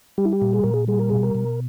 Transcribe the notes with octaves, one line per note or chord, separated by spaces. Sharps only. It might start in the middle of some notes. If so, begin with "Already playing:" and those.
G3 G4
E4
G4
A#2
G#4
A#2 A#4
G#4
G3 G#4
A#4
B2 G#4
A#4
B2